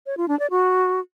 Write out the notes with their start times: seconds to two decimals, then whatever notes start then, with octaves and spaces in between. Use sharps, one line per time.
0.06 C#5
0.17 F4
0.28 D4
0.39 D5
0.50 F#4